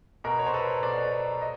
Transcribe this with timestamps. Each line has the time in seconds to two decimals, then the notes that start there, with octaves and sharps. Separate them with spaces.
0.24 B2 A#4
0.39 C#5
0.46 C5
0.54 A4 B4
0.83 B2 C5 D5
1.41 D#5